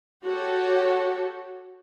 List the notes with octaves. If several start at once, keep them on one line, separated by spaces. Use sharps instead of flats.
F#4 G4 A4 C#5